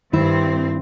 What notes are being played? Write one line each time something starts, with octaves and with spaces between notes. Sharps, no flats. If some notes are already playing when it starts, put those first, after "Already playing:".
G2 D#3 C4 E4